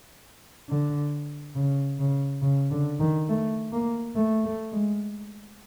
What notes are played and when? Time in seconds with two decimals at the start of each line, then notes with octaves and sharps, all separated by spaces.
0.69 D3
1.55 C#3
1.99 C#3
2.42 C#3
2.71 D3
3.00 D#3
3.28 A3
3.72 A#3
4.15 A3
4.44 A3
4.72 G#3